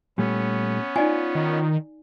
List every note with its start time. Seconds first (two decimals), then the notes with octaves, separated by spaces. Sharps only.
0.18 A#2 G3 A3 B3 C#4
0.96 D#4 F4 D5 G#5
1.35 D#3